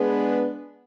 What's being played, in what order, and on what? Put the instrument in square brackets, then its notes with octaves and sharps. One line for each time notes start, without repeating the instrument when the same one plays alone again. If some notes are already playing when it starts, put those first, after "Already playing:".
Already playing: [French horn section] G#3 B3 D4 G#4 B4